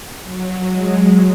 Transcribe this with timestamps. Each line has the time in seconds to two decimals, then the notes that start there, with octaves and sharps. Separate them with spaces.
0.24 F#3
0.67 G#3